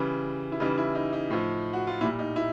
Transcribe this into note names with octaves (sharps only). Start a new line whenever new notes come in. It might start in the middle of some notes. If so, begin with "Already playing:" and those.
Already playing: C#3 E3 G3
E4
C#3 E3 G3 D#4
E4
D#4
D#4
A2 F3
F#4
F4
A#2 G3 E4
D#4
E4